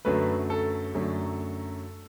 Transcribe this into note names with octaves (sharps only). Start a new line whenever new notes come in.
F#2 D3 F#3 A3 B4
A4
F#2 D3 F#3 A3